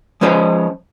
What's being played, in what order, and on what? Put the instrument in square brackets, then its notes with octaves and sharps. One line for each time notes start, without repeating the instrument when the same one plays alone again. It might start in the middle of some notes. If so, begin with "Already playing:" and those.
[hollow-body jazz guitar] F3 G#3 C#4 B4 C5 D#5